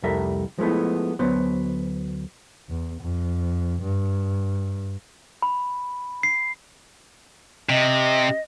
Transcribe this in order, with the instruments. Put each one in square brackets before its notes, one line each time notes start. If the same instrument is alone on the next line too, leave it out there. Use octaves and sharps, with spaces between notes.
[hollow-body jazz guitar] C2 F2 G3 A3 A#4 E5
F3 G#3 A3 B3 E4
D2 F#3 B3 B4 C5
[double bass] E2
F2
G2
[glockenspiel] B5
C7
[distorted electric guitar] C3 [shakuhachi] D#5